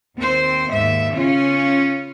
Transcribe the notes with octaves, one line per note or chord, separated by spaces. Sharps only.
D#2 C4 C5
D#2 G#2 E5
C#3 C#4 F4